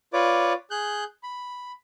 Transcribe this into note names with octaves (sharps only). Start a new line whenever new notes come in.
F4 B4 C#5 D5 D6
G#4 F#6 G6
B5